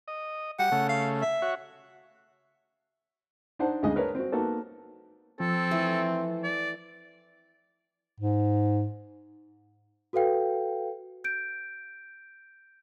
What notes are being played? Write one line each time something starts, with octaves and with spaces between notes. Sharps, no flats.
D#5
G3 F#5
C#3 A3
F5
E5
F#4 C#5
D4 D#4 C5 F#5 A5
D2 C#3 G#3 D#5
D4 A#4 B4 C#5
C4 F#4
A#3 B3 D#4 F#4 A4
F3 C4 A4
E3 A3 B4
D5
G#2
F#4 A4 B4 F5 G5
G6 D7